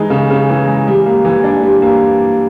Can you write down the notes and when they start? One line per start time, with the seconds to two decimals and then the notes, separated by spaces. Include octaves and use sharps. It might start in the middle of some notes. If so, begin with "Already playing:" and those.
Already playing: E3 G#3 D#4
0.10 C#3
0.30 C#3
0.49 E3
0.67 G#3
0.87 G3
1.06 A#3
1.25 E3
1.44 D4
1.63 G3
1.82 A#3